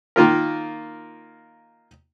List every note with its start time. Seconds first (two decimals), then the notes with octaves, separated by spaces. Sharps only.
0.16 D#3 A#3 F4 A#4